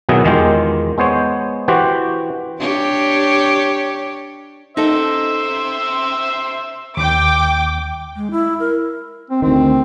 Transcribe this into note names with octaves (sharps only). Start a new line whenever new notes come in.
B2 D#3 F#3 E4 G#4
E2 D#3 G#3 F4 G4
G#3 B3 C5 C#5
E3 F#4 G4 C5
D4 G4 C#5
D#4 A4 C5 E5 C6
D#2 G5 D6
G#3
E4
A#4
C4
D2 D#3 C4